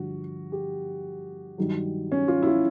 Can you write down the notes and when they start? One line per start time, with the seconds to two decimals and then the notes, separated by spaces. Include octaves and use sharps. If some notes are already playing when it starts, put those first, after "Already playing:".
Already playing: G2 D3 F3 F#4
0.52 G4
1.58 G2 D#3 F#3
2.12 C#4
2.28 F4
2.42 E4
2.47 F4